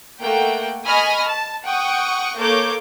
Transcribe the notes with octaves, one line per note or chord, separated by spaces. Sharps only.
A3 A#3 F#5 G5
D#5 G#5 B5 C#6 D#6 F6
A5
F#5 G5 C#6 D#6
A#3 A4 C#5 D6 G6